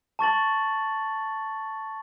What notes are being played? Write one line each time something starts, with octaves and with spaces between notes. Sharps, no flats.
A5 C#6 A6 F#7